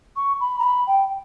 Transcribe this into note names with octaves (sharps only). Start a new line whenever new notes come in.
C#6
B5
A#5
B5
G5